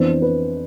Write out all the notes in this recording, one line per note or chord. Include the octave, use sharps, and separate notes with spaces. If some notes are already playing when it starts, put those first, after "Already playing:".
Already playing: F2 E3 B3 D4 C5
B4